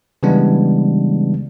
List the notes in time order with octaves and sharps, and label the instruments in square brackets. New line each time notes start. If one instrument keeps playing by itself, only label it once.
[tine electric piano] C#3 E3 G3 G#3 B3 D4